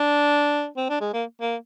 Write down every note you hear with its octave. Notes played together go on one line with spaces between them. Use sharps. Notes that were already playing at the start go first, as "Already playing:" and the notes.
Already playing: D4
C4
D4
G#3
A#3
A#3